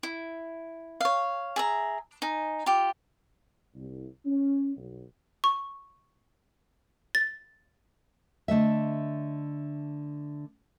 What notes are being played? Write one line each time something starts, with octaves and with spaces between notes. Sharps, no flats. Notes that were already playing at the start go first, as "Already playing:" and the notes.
E4
C#5 F5
G#4 E5 A#5
D#4 G#5
F4 G4
C2
C#4
B1
C#6
A6
D3 A3 D#5 E5